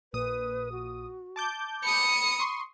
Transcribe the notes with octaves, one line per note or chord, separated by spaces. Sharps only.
A#1 A#2 B4 D#6
F#4
A5 D6 G6
B5 D#6 C#7
C6 C#6 D#6